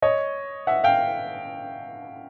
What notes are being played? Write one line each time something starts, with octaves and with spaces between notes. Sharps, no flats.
C#5 D#5
E5 F#5
F5 G5